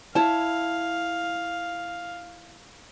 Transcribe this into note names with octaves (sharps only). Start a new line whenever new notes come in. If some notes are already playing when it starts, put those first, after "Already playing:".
E4 C#5 F5 A5